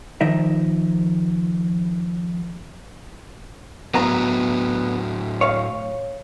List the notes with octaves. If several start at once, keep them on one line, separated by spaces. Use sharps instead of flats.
D#3 F3 D#4 E5
A2 F#3 B3 A#5
C#5 F5